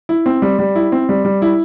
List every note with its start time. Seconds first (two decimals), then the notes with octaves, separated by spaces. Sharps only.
0.09 E4
0.26 C4
0.42 G3
0.59 G3
0.75 E4
0.92 C4
1.09 G3
1.25 G3
1.42 E4